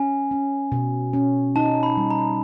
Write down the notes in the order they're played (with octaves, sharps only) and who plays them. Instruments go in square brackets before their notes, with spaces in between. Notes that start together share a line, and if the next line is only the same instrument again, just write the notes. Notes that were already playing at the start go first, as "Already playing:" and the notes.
Already playing: [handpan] C#4 [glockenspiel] G#5
[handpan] C#4
B2
C#4
[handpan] D#4 [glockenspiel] A5
[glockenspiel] B5
[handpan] G3
[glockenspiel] A#5